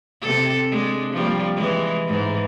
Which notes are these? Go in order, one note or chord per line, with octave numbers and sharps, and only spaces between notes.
C3 A4
G#3 D4
F3 G3 A#3
E3 G#3
G#2 E3